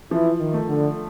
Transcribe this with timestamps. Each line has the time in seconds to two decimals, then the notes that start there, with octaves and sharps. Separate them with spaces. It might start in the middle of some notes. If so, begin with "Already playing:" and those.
0.11 E3 F3
0.40 D#3
0.54 A3
0.68 D3